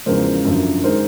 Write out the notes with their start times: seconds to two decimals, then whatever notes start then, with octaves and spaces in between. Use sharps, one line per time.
0.06 E2 C#3 F3 G#3 A#4 C5
0.44 F#2 D3 F3
0.83 D#3 G#3 A#4 C5